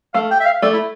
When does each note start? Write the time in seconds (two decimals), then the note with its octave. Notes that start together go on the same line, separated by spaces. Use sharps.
0.14 A3 F5
0.31 G5
0.40 E5
0.46 F5
0.62 A3 D5
0.73 E4